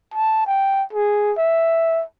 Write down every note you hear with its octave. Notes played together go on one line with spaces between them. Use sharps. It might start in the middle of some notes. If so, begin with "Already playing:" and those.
A5
G5
G#4
E5